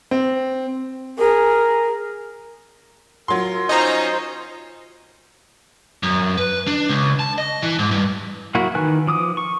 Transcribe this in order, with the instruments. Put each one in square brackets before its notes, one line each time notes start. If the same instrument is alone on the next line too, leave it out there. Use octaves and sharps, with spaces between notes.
[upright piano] C4
[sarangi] G#4 [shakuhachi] A#4
[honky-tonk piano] F#3 C6 [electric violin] F4 A#4
[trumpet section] C#4 D#4 [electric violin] F4 C5 [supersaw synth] D#5 A#5
[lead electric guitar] F#2
B4
D4
C#2
A5
D#5
E3
G#2
G2
[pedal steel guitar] F#3 A#3 E4 F#4
D#3 E3 B4 G#5 F#6
F3 D6 D#6
C#6